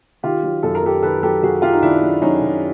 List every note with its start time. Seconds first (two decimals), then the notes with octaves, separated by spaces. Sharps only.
0.23 D#3 F4 G4
0.43 F#3
0.63 F#2 A4
0.75 A#4
0.83 F#2 G4 A4
1.02 D#3 A4 B4
1.23 F#3 G4 A4
1.43 F#2 F#4 G#4
1.62 F#2 F4 G4
1.73 D#4
1.83 D#3 D4 E4
2.02 F#3
2.22 F#2 C#4 D#4
2.42 F#2